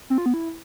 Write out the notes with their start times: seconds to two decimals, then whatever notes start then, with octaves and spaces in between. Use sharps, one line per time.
0.10 C4
0.18 F4
0.26 B3
0.34 E4